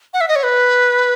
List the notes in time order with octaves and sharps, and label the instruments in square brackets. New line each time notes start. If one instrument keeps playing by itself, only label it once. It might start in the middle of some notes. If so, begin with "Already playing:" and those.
[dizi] F#5
E5
D#5
C#5
B4